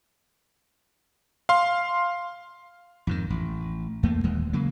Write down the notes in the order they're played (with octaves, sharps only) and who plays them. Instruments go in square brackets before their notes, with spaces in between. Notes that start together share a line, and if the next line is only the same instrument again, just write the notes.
[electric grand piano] F5 C6
[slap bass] F2 G#2 D#3
A1
E2 A3 A#3
D#1 D#2 E3 G#3
C#3 F#3 G#3 A#3